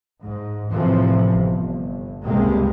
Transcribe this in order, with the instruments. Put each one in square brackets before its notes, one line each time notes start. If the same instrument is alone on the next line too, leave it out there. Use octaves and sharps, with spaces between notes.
[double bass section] G#2
A2 C3 E3 F3
G1
C#2 G2 C3 G3 G#3 A#3